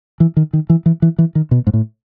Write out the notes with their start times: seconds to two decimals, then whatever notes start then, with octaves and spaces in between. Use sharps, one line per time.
0.20 E3
0.37 D#3
0.53 D#3
0.70 E3
0.86 E3
1.02 E3
1.19 E3
1.35 D#3
1.51 B2
1.67 G#2
1.74 A2